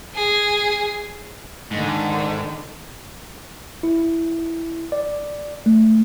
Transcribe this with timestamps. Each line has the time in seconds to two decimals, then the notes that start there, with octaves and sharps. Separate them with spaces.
0.15 G#4
1.71 G#2 D3 D#3
3.83 E4
4.92 D5
5.66 A3